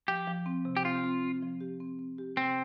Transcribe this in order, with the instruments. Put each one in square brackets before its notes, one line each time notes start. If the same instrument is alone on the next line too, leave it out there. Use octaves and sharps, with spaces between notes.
[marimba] F3 [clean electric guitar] G4
[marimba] F3
C4
C3
[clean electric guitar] G4
[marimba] C4 [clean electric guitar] F4
[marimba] C4
C4
F3
G4
C4
C4
G4
[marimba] C3 [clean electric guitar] C4